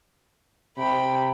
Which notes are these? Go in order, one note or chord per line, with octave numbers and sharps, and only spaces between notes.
C3 G5 B5